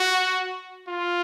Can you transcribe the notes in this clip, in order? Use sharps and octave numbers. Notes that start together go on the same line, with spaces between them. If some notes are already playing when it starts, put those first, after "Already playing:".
Already playing: F#4
F4